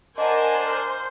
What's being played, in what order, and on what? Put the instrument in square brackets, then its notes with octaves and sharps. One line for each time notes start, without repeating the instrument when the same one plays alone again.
[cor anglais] D4 [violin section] A#4 G#5 A5 [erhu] C5 [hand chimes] D#5 F#5
[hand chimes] F6 G6